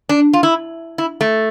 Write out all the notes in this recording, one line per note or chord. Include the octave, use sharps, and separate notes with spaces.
D4
F4
E4
E4
A3